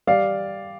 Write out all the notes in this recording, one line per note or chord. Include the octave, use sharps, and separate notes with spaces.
G3 D5 F5